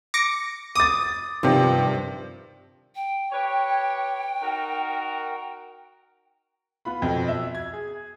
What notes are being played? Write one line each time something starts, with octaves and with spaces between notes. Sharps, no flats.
D6 A#6 C#7
D6 D#6 A6
G2 C3 D#3 F3
G5
G4 B4 C#5
D#4 F#4 A#4
B3 F4 B5
F2 B2
E5
G#6
G#4